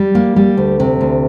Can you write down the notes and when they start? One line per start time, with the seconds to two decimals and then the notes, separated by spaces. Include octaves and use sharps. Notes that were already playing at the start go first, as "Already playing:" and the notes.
Already playing: G3
0.15 A#3
0.36 G3
0.57 D2
0.80 C3
1.01 D2